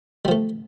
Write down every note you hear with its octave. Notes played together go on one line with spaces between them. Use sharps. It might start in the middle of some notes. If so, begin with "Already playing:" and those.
F3 G3 A3